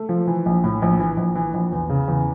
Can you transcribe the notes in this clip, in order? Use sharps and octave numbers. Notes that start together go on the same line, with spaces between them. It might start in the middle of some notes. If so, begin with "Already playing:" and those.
Already playing: A3
F3
E3
A#1
A2
A#1
E3
A#1
E3
A#1
E2
C#3
E2